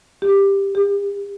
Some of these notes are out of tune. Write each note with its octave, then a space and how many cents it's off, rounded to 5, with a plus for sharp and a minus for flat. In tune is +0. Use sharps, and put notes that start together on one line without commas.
G4 +10
G4 +45